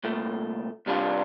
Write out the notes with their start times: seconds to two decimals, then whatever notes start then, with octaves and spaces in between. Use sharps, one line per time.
0.04 C2 A#2 A3
0.86 C2 C3 G3 D4 F4